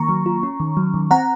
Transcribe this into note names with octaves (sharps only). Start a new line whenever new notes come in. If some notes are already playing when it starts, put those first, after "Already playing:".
Already playing: D#3 A#3 A#5 C#6
F#3
F4
C#4
D#3
F#3
D#3
C4 F#5 A#5